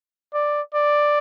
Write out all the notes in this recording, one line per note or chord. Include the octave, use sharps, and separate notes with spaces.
D5
D5